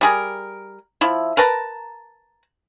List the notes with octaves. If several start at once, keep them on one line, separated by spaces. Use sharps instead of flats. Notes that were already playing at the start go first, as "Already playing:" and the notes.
G3 G#4 A#4
F3 E4
A#4 B4 A5 A#5